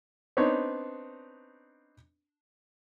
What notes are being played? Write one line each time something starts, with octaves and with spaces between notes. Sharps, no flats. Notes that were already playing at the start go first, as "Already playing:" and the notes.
B3 C4 D4 D#4 C#5